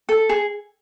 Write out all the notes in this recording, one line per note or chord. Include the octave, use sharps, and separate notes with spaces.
A4
G#4